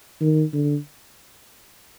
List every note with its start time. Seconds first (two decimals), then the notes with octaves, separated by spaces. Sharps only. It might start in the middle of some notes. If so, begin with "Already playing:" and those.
0.21 D#3
0.54 D3